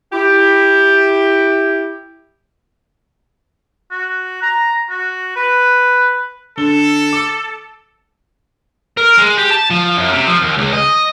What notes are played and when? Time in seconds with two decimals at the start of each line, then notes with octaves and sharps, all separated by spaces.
0.12 E4 G4
3.91 F#4
4.42 A#5
4.90 F#4
5.36 B4
6.57 D3 A4 G7
7.13 D6
8.97 A#4
9.18 G#3
9.37 G4
9.51 A5
9.70 F3
9.97 F#2
10.13 C3
10.27 F3
10.42 D#2
10.58 C#2
10.73 D#5